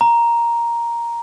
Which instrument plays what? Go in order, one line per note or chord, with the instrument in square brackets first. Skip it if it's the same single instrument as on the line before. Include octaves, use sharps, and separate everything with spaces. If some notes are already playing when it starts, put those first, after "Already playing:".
[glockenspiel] A#5